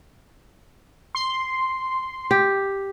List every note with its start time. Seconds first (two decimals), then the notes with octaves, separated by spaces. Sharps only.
1.15 C6
2.31 G4